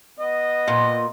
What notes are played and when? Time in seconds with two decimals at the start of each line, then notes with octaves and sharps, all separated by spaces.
0.19 B3 D#5
0.68 A#2